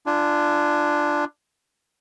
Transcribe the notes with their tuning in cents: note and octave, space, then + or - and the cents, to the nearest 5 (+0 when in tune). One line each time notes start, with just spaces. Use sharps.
D4 +10 F4 -25 G#5 +5